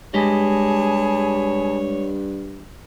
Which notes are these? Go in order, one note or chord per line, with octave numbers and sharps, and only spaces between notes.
G2 G#3 G4 G#4 C#5 D#5 A5 B5